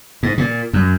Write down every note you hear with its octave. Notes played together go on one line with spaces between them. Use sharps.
G#2
A#2
F#2